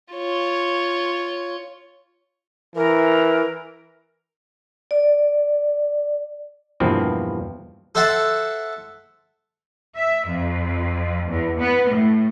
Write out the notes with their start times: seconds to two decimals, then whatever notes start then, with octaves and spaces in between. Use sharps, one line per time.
0.14 F4 C#5
2.75 E3 A#4
4.91 D5
6.80 E2 G2 B2 F3 A#3 C4
7.95 A4 C5 E5 F#5 A5
9.95 E5
10.26 F2
11.30 E2
11.59 B3
11.89 A2